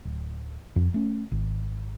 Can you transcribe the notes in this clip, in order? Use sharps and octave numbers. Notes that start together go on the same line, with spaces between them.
D1
F2
A3 C#4
G#1